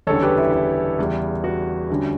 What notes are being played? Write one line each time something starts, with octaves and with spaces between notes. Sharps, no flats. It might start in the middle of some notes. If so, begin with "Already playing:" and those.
F#1 E2 D3 G3 C#4 A4 C#5
G4 B4
E4
E4
E2 C#3 G3
F#4
D2 D3 G3 C#4